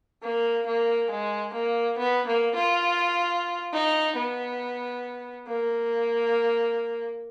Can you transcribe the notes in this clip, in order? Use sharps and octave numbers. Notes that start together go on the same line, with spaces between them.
A#3
A#3
G#3
A#3
B3
A#3
F4
D#4
B3
A#3